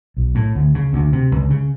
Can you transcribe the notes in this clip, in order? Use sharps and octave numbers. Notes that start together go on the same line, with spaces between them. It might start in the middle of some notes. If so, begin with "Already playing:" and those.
B1
A2
D2
C#3
D2
C3
C#2
C#3